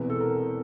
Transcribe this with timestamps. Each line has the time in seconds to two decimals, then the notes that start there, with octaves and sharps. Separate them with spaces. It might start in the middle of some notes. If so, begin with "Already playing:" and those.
Already playing: E1 E2 C3 E3 B4
0.10 A4
0.20 A#4